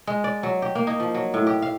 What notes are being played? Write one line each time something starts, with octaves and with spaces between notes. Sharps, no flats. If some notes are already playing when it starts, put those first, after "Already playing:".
G#3
D5
F#3
G4
A#3
D#4
F3
F#3
A2
G4
F5